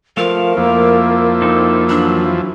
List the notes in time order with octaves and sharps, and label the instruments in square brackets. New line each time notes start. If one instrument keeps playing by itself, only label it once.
[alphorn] F3 [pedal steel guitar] A3 F5 [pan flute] A#4
[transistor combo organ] F2 F3 E4 [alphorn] A#3
[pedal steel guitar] C4 D#4 A4
[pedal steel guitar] E3 F#3 B5 [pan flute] D4